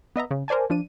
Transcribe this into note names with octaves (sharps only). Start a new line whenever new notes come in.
B3 D#5 E5 A#5
C#3
A#4 C5 D5 G#5 A5
F3 D4 D#7